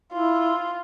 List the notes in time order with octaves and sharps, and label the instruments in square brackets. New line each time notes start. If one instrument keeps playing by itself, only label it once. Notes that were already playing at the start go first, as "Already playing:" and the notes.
[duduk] E4 [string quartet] F4